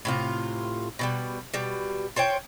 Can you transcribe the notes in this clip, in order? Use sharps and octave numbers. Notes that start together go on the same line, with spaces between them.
A2 C3 F4
B2 E3 G3
B2 G3
F4 C5 C#5 G5